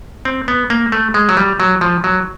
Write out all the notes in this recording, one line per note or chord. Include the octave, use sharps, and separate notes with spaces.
C4
B3
A#3
A3
G#3
F#3
G3
F#3
F3
F#3